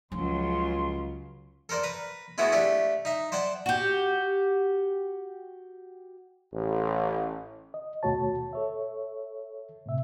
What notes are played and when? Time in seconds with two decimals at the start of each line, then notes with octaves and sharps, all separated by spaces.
0.12 C#2 C#3 F3 F#3 A#3 F4 C6
1.69 A4 A#4 C5 D5
1.84 B4 A#5
2.38 G#3 A3 B3 E4 F#4
2.52 A3 D4 G4 A4
3.05 D#4 E5
3.32 C5 D5 F#5 G5 A5
3.66 F#4 G4
6.53 A1
7.74 D#5
8.03 D#2 B2 A3 F#4 C#5 A5
8.53 A4 C#5 E5
9.86 A2 C3 E5